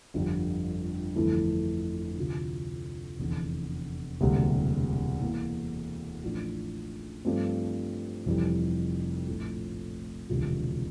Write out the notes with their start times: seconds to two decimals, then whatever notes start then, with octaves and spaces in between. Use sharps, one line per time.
0.14 G1 F2 D3 G3
1.15 G1 F2 E3 A3 E4
2.18 D2 C3 F3
3.19 F1 E2 D3
4.20 E1 D2 C3 G3 A#3
5.22 E2 E3 A#3
6.23 A1 A2 F3 A3 D4
7.25 G2 F3 A3 C4
8.26 F1 F2 E3 G3
9.27 A#1 A2 F3 A3
10.29 E1 D2 C3 F3